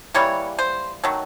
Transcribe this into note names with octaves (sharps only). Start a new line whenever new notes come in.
E3 G3 A#3 C#5
C5
D#3 F#3 A3